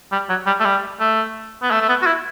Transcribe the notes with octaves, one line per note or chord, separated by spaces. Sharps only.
G3
F#3
G3
A3
G3
A3
B3
A3
A3
B3
F#4
E4